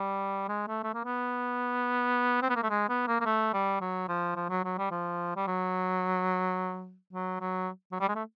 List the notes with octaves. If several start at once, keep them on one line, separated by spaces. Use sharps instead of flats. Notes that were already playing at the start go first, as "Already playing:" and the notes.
Already playing: G3
G#3
A3
A3
A#3
B3
C4
B3
A#3
A3
G#3
B3
A#3
A#3
A3
G3
F#3
F3
F3
F#3
F#3
G3
F3
G3
F#3
F#3
F#3
F#3
G3
G#3
A3